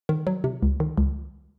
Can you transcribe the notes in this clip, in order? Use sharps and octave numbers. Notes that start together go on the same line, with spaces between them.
D#3
F#3
C3
C#2
D#3
C#2